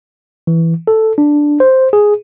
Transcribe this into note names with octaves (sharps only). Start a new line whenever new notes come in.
E3
A4
D4
C5
G#4